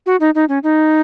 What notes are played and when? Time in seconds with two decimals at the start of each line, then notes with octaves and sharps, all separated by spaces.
0.06 F#4
0.20 D#4
0.35 D#4
0.49 C#4
0.63 D#4